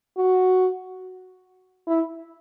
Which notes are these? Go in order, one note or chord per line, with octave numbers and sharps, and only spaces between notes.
F#4
E4